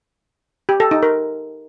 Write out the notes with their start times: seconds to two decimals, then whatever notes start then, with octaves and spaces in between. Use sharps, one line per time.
0.69 G4
0.80 A4
0.91 D#4
1.03 A#4